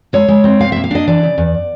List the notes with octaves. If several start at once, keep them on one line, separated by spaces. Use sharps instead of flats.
G#3 C#5
G#3
C4
B2 F5
A#3 E5
F5
D4 D#5
E3 D5
C#3
E2